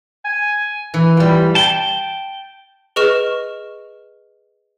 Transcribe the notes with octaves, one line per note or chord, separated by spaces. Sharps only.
G#5
E3
G3 F4 G5
G5 A5
G#4 B4 D#5 C#6 F6 E7